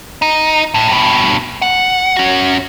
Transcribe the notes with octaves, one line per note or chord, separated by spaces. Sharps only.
D#4
A2
G2 B2
F#5
C#4 F#4